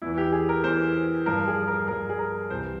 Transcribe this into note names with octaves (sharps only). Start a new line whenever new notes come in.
E2 E3 E4
G4
G#4
A#4
E2 E3 C5
G2 F3 A#4
G#4
A#4
G2 F3 A#4
G#4
A#4
C2 C3 E3 C5